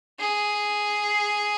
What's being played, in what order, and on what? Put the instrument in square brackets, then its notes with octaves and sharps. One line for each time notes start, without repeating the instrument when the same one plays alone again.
[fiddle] G#4